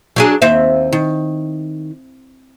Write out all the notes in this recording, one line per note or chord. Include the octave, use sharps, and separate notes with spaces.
F#3 D4 G#4
D#2 C4 E5
D#3